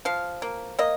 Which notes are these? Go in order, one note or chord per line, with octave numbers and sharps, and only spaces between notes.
F3 F5
A#3
A#3 D#5